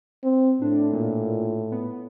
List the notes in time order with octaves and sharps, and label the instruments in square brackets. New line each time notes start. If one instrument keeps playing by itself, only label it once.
[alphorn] C4
[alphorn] A2 [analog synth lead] D4
[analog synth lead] A#2
B3